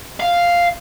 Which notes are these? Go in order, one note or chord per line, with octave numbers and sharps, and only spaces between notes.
F5